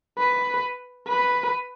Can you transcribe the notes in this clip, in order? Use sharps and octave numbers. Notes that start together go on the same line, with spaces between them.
B4
B4